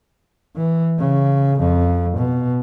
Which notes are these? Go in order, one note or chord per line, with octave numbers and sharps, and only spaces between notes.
E3
C#3
F2
B2